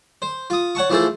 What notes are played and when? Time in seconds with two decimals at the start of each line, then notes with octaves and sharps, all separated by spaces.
0.22 C5
0.50 F4 D#6
0.75 C#5 F#5 A5 C#6
0.90 E3 F3 A3 G#4 A4 C5